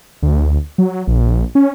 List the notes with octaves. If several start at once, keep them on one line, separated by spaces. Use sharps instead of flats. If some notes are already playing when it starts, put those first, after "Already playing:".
D2
F#3
A#1
C#4